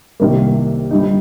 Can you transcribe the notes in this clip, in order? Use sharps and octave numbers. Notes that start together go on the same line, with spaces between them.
C2 C3 D#3 A#3
G1 G2 G3 D#4